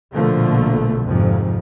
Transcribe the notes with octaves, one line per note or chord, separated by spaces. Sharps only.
A#1 B2 D3 F3 A3 A#3
G#1 F2 G#2 C3 F3